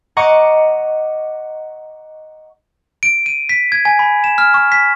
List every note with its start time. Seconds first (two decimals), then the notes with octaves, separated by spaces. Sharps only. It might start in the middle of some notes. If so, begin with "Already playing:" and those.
0.17 D#5 F#5 A#5 C#6 D6
3.03 D7
3.26 D#7
3.49 B6
3.72 G#6
3.85 G#5
3.99 B5
4.24 E7
4.38 F6
4.54 C#6
4.72 B6